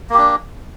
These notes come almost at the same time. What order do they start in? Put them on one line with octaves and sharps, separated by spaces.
A#3 G4 D4